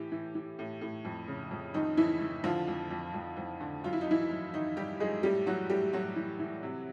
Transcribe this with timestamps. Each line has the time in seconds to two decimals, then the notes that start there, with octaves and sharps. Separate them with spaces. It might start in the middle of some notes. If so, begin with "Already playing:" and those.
Already playing: A2 E3 G4
0.12 E3
0.35 E3
0.59 A2
0.81 A2
1.05 F2
1.28 C#3
1.51 F2
1.74 F2 D#3 D#4
1.97 F2 E3 E4
2.21 E3
2.44 D3 F3 F4
2.68 F2
2.91 F2
3.14 F2
3.37 F2
3.61 D3
3.84 F#2 F4
3.93 E4
4.01 D#4
4.07 F#2 E3 E4
4.30 F#2
4.53 D#3 D#4
4.77 D#3 G3 G4
5.00 F#2 G#3 G#4
5.23 A2 G3 G4
5.46 E3 F#3 F#4
5.70 A2 G3 G4
5.93 A2 F#3 F#4
6.16 E3
6.39 E3
6.63 C3